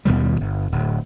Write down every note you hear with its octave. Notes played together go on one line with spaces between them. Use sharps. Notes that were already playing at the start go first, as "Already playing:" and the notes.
D#2 B2 D#3 G3
G1
D1